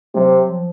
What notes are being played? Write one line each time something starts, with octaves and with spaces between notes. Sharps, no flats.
C3 F#3
F3